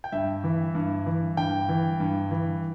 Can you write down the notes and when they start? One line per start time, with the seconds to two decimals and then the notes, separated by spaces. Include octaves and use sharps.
0.04 G5
0.12 G2 E5
0.44 E3
0.75 G2
1.06 E3
1.37 G2 G5
1.69 E3
2.00 G2
2.31 E3